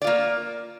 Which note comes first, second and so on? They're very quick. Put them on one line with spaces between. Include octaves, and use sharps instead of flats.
D5 F4 A#3